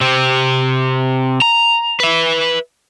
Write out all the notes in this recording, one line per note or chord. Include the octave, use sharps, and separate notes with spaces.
C3 C4
A#5
B4 E5